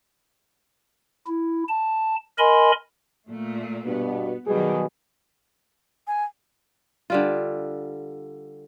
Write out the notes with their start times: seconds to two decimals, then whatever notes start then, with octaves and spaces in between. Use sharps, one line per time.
1.27 E4
1.68 A5
2.39 A#4 D#5 G#5 B5 C6
3.28 A#2 A3
3.85 G2 B2 B3
4.47 B2 D#3 F#3 G3 G#4
6.07 G#5
7.10 D3 G3 F4